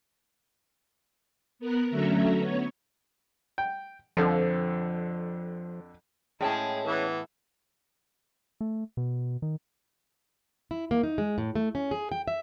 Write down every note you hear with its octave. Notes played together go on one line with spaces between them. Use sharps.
B3 A#4 F#6
D3 F#3 A3 C#4 E5 A#5
B3 C#5
G5
F2 D3 F3
A2 G#3 C#4 E4 G#4 G5 A5
E3 B3 E5
A3
B2
D#3
E4
A#3
D#4
G#3
A2
A3
C#4
G#4
G5
E5